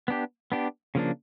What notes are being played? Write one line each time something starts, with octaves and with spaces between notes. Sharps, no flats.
B3 D4 G4
B3 D4 G4
C#3 F3 A#3 D4